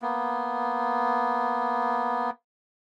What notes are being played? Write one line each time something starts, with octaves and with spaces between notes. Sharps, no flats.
A#3 B3